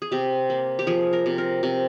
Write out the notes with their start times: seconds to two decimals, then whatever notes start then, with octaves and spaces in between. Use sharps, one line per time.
0.02 G#4
0.12 C3 G4
0.50 A#3
0.79 G4
0.87 F3 G#4
1.13 A#4
1.26 C3
1.38 A#4
1.63 C3